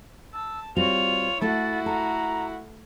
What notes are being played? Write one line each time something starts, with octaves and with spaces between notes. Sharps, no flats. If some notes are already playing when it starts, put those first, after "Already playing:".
A5 E6
G3 C4 F4 F#4 C#5 F7
A3 E4 F#4 A4 A6
A4 A#5